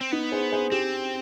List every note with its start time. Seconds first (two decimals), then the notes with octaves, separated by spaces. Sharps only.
0.01 C4
0.12 B3 D#4
0.32 G#4 C5
0.52 G#4 C5
0.72 C4 G4